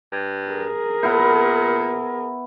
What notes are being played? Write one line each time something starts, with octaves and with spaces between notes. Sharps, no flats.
G2
G#4 A#4
A#2 B3 E4